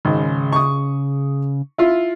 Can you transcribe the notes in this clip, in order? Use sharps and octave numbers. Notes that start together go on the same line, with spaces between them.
G#1 C#3
C#6 D#6
E4 F4